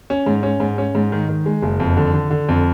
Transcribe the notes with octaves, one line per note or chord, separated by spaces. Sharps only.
C#4
G#2
C#4
G#2
C#4
G#2
D#3
D#3
G#3
F#1
F2
D3
D3
D3
F2